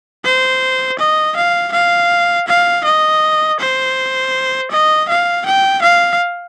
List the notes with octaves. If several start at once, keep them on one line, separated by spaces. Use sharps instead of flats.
C5
D#5
F5
F5
F5
D#5
C5
D#5
F5
G5
F5